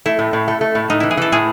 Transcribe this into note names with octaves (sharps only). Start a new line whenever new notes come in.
A3 E4
A2
A2
A3
A3
A2
A2 D#4
E3 E4
G#4
E3 A4
A2 G#4